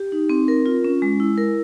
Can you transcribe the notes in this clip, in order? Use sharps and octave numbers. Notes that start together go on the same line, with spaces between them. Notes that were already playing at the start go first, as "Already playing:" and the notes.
Already playing: G4
D#4
C4
A#4
F4
C#4
G#3
E4
A#4